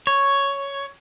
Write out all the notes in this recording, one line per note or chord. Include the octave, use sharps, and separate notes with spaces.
C#5